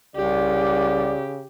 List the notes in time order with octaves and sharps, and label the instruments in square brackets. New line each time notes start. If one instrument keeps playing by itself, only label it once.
[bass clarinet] C2 [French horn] C#3 [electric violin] G4 [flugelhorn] D5